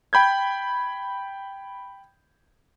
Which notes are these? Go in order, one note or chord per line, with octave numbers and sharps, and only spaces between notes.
G5 B5 G6 G#6